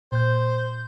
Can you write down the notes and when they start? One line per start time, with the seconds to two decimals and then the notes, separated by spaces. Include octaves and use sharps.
0.12 A#2 C5 G6